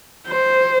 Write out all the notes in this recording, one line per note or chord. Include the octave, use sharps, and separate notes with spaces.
C5